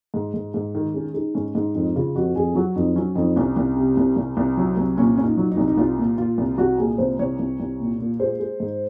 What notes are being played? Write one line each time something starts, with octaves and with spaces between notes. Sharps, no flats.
G#2
G#2
G#2
D#3
G#3 C#4
G#3 D#4
G#2 C#4
G#2 D#4
F2 D#4
C#3 F4
F2 F#4
F2 G#4
F#3 F#4
F2 D#4
F#3 C#4
F2 D#4
C2 C#4
C2
C3
C2
C2
C2
F#3
C2
A#2 C#4
A#2 C#4
D#4
F#3
D#4
C2
D#4
C2 F4
A#2
A#2 F4
C2
C2 F#4
A#2 G#4
C2 C5
C2 C#5
C2
C2
A#2
A#2
G#3 C5
G#3
G#2